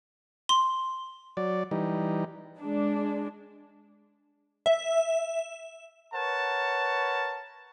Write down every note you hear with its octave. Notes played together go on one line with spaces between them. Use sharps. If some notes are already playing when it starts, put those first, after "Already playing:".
C6
F#3 D5
E3 G3 D#4
G#3 D4
E5
A#4 B4 C#5 F#5 A5